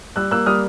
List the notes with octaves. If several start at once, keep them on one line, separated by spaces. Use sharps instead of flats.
G3 E6 F#6
A#3 E6 F#6
G3 D#6 F6